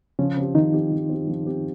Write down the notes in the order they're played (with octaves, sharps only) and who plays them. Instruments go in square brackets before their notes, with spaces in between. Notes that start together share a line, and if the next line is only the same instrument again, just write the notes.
[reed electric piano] C#3 C#4 [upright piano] F3
[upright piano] C4 G4
[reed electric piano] D#3 D#4 [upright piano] F3
[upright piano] C4 G4
F3
C4 G4
F3
C4 G4